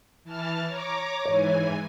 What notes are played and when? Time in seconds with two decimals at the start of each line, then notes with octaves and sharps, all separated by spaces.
0.24 E3 A5 F6
0.67 C#5 A#5 D6
1.26 G#2 E3 C#5 G#5